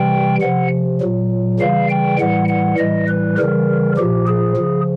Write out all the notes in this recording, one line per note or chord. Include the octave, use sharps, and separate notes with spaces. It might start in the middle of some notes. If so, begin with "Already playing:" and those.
Already playing: C3 E3 G3 G5
C3 F3 F#5
A#2 F#3
C#3 E3 G3 F5
G5
A2 E3 G3 F#5
F#5
A2 E3 G3 D#5
B4
C#3 E3 G3 A#4
A#2 F3 G4
G#4
C#3 F3